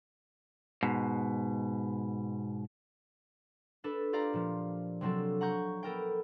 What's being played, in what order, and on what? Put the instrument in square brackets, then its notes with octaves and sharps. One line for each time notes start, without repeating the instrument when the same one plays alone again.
[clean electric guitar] G#2 B2
[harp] D4 A4 B4
F4 G4 D5 F5 A#5
A#2 F3
C3 F#3 C4 D4 A4
F#5 A#5 C#6 G6
B3 A4 A#4 G5